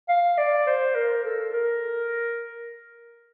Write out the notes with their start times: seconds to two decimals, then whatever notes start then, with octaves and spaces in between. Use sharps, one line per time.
0.09 F5
0.38 D5
0.67 C5
0.95 A#4
1.25 A4
1.53 A#4